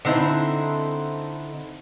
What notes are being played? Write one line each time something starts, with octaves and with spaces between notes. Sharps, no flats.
D3 C4 D#4 E4